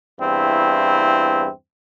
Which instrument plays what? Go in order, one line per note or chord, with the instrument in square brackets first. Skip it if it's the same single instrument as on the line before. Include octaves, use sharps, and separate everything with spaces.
[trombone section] E2 G2 C4 E4